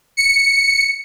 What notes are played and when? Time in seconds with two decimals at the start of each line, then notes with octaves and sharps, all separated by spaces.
0.17 C#7